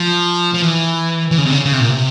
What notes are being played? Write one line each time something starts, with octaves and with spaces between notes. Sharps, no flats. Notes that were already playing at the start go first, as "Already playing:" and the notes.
Already playing: F3
F3
E3
E3
C#3
C3
C#3
C#3
C3
A#2
C3